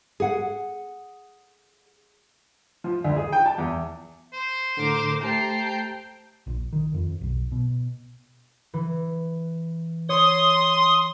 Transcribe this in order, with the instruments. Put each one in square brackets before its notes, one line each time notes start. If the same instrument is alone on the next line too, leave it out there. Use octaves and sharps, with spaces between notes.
[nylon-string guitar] G#4 F#5
[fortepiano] F3
D2
G#4
G5
A5
E2
[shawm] C5
[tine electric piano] A2 D3 [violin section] A#4 D6
[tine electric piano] A3 G4 C5 [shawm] G5 [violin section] A5 A#5 C7
[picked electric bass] A#1
D#3
F2
B1
B2
[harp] E3
[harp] C#5 [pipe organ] C6 D#6